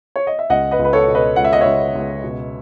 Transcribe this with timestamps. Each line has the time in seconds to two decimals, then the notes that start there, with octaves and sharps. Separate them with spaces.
0.16 C#5
0.27 D#5
0.39 E5
0.50 C#2 D#5 F#5
0.71 B4 D#5
0.79 C#2
0.85 B4
0.93 A4 C#5
1.07 B2
1.15 B4 D#5
1.36 C#2 F#5
1.45 E5
1.53 D#5
1.61 C#2 C#5 E5
1.95 C#2
2.24 B2